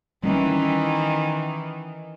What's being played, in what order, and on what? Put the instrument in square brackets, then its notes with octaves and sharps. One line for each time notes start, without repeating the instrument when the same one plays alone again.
[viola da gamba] D#3 E3 [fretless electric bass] G3 C4 C#4